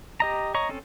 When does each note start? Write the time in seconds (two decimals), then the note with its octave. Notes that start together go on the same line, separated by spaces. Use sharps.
0.20 G4 D#5 A#5
0.54 C#5 D#5 A#5 C#6
0.69 C4 C#4 A4